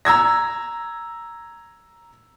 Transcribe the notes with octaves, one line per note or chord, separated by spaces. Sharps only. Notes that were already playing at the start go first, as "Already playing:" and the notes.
A#5 E6 G#6 A#6